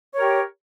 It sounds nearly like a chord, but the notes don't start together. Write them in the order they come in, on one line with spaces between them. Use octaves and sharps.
C#5 A#4 G4